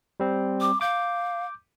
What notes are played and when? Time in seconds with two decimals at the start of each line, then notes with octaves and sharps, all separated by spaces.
0.20 G3 C4
0.61 D6
0.81 F5 D6 G6